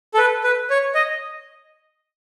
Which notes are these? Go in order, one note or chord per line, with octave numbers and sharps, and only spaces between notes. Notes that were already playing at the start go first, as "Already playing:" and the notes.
A4
B4
B4
C#5
D#5